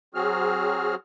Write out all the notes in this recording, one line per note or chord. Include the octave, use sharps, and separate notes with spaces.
F#3 C4 F#4 G#4 F6